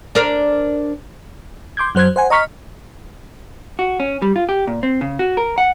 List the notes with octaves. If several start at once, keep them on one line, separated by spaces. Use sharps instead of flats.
D4 A#4 C5
C6 D6 G6 G#6
F#2 F#3 C5 F#6 G#6
C5 F#5 G#5
D#5 A#5 C#6 F6 B6
F#4
C#4
G3
F4
G4
A#2
C4
C#3
F#4
A#4
F#5